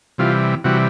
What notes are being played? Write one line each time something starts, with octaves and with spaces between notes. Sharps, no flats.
C3 E3 G3 F4
C3 E3 G3 F#4